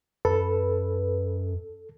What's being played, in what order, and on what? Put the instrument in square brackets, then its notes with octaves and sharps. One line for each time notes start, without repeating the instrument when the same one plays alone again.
[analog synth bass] F#2 [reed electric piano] A4 [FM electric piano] B4